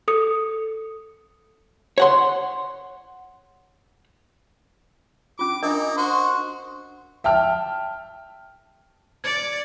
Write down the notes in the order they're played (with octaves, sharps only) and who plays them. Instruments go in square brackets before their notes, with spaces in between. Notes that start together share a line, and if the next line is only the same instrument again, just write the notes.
[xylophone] A4 D#6 C#7
[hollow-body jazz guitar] C#5 F#5 C6
[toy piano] C#4 F4 [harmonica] D6
[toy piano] D4 A#4 D#5 [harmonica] D#4
[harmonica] F#4 C5
[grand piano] E5 G5 A5 F6
[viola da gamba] D5 [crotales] G#6 C#7